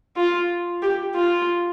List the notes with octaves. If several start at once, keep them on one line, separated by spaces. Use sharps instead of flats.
F4
G4
F4